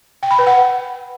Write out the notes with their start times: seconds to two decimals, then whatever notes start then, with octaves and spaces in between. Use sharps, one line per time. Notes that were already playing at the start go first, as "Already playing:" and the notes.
0.23 G5
0.31 B5
0.39 B4
0.47 F#5